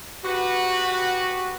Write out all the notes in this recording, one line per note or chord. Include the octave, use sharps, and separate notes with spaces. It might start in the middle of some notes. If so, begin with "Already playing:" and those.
F#4 G4 B4